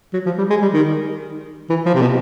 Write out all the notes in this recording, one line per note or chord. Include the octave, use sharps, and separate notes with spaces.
F#3
F3
G3
G#3
G3
D#3
E3
F3
C3
B2